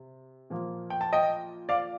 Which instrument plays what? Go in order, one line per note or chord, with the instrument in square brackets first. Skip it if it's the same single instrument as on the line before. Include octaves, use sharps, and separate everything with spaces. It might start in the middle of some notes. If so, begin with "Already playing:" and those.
Already playing: [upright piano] C3
A#2 F3 A#3
G5
A5
D#5 G5
D5 F5